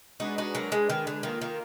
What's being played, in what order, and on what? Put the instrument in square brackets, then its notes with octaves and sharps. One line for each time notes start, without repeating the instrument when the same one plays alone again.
[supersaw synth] G#3 D4 G#4 B4 [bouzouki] D#4 F#4
[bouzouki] D#4 F#4
F#3 A#3
G#3
D#3
D3
[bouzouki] D#3 [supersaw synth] A#3 F4 A#4
[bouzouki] D#3